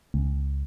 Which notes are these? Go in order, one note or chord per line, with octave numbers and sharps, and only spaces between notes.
C#2